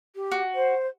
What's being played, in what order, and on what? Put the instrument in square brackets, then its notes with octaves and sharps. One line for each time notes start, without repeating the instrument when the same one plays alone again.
[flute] G4
[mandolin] F#4
[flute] C5